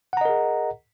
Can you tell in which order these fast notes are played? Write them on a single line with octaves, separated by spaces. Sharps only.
F#5 A#5 D#5 A#4 G#4